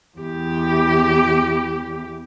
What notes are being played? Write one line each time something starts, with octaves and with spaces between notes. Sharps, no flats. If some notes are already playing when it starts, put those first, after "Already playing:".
E2 G4